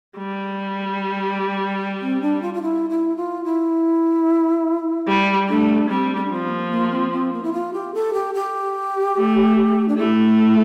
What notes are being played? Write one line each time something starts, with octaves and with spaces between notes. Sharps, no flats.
G3
C4
D4
F4
F4
E4
E4
F4
E4
G3
A3 D4
G3 C4
C4
D4
F3 C4
C4
A#3
A#3
C4
C4
A#3
E4
F4
G4
A4
G4
G4
A3
D4
A3 E4